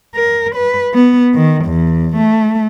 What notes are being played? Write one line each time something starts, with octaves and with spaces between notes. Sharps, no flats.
A#4
B4
B3
D#3
E2
A3